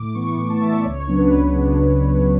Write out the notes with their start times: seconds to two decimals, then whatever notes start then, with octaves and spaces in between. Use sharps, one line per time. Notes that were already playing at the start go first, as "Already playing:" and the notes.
Already playing: A2 D6
0.14 E3 B3 C#6
0.37 A2
0.50 A5
0.61 E3 B3 E5
0.72 D5
0.84 C#2 C#5
1.00 C#5
1.07 C#3 F#3 B3 D4
1.16 B4
1.31 C#2
1.55 C#3 F#3 B3 D4